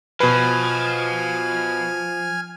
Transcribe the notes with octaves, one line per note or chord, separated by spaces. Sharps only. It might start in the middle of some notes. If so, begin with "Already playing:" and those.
B2 F3 B4 G#5 F6